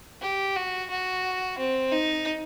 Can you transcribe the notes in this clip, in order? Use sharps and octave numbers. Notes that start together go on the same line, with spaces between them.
G4
F#4
F#4
C4
D#4